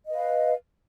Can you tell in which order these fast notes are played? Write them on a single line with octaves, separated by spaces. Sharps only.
D#5 B4 F5